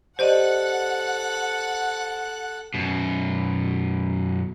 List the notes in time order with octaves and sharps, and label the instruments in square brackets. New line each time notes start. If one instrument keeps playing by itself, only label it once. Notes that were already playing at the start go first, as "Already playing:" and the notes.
[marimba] G4 D5 D#5 [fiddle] A4 F#6 [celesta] C5 [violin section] F#5
[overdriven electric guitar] F#2 B2